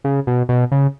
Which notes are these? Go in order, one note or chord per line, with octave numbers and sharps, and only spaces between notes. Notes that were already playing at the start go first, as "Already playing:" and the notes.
C#3
B2
B2
C#3